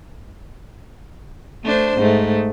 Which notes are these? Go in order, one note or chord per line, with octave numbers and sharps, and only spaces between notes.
A3 D4 C5
G#2 A3